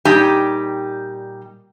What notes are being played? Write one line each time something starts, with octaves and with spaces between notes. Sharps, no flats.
A#2 G3 D#4 G4